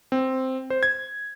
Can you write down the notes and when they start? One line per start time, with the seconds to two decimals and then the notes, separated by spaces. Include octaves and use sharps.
0.12 C4
0.70 C5
0.83 G#6